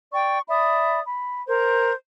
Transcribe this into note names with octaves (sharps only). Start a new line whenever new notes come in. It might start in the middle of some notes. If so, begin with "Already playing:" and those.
D5 G5 C#6
D5 E5 B5 D#6
B5
A#4 C5